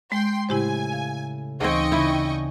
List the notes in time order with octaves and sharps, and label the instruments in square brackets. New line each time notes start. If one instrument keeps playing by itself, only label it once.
[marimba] G#3 [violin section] G5 C6
[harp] A2 C#3 A3 [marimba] E4 G4 C5 [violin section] G#5
[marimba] F5
[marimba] D2 E3 [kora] C#3 C4 [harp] D#4 [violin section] D#5 G5 C#6
[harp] C#3 D4 [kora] E4 [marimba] B5